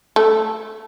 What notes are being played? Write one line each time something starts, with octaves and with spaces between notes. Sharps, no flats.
A3